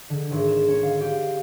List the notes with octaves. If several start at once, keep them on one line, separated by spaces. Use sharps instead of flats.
D3
G#1
E7
C#4
F5
G4
F5